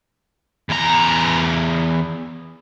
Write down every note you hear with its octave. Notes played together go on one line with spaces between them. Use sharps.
E2 A#5